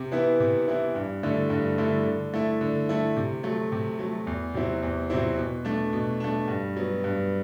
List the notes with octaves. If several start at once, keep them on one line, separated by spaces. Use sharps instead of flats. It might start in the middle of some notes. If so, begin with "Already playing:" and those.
Already playing: C3
E3 B3 E4
C3
E3 B3 E4
G2
D3 A3 E4
G2
D3 A3 E4
D3
A3 E4
D3
A3 E4
C3
F#3 A3
C3
F#3 A3
E2
C3 F#3 C4 E4
E2
C3 F#3 C4 E4
B2
A3 D4
B2
A3 D4
G2
F#3 B3
G2